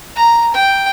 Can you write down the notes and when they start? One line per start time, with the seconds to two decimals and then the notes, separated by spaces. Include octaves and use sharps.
0.16 A#5
0.54 G5